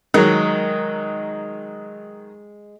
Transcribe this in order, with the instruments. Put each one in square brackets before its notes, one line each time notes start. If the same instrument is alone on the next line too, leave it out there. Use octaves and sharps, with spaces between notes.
[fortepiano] D#3 F#3 [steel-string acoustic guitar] G#3